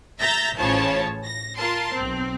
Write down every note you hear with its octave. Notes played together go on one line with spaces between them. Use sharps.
E5 A#5 G6 A6 A#6
A1 C#3 F3 C#5 A5
A#6
F4 A#4 A5 C6
B1 C4